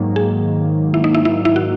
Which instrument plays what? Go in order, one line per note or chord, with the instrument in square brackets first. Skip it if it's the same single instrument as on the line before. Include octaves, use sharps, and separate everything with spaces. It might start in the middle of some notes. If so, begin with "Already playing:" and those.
Already playing: [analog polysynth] G#2 D#3 F#3 A#3
[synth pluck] G#4
E4
D#4
E4
E4
E4
F#4